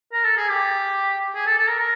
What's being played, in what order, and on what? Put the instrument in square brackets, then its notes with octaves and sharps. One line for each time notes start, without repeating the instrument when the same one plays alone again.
[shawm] A#4
A4
G#4
G4
G#4
A4
A4
A#4
A#4